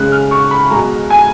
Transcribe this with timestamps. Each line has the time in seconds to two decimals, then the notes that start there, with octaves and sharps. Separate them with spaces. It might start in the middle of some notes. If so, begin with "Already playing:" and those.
Already playing: C#3 G#3 F#6
0.12 F6
0.31 C#6
0.51 B5
0.71 B2 G#3 A#5
1.10 G#5